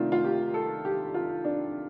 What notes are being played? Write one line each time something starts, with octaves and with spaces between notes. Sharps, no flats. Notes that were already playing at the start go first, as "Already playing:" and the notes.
Already playing: C3 D#3 A3 D4 F4
F4
G4
A4
G4
F4
D4